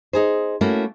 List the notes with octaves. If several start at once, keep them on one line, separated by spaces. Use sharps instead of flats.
D#4 G#4 C5
A3 A#3 C#4 E4 F#4